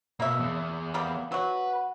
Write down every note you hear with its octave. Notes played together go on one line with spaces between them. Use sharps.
B2 A#3 E5
E2
G3 A#3 B3
F#3 F#4 B4